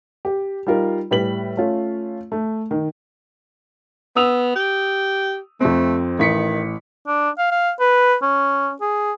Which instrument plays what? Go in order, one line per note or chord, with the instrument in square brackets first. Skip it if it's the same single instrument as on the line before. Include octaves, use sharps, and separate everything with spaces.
[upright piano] G4
G3 D#4 F4 A#4
A2 G3 B4 B6 F#7
A3 C#4 F4
A3
D#3
[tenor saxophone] B3 [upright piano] D#6 E6 F7
[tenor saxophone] G4
[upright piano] F2 C4 [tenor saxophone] A3
[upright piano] A1 B6 C#7 [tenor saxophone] D#3
[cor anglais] D4
F5
F5
B4
C#4
G#4